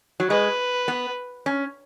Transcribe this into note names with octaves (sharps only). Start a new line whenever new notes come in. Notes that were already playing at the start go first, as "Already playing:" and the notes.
F#3
G#3 B4
B3
C#4